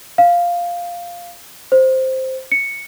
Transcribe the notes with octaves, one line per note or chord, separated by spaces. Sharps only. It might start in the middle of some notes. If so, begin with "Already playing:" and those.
F5
C5
C#7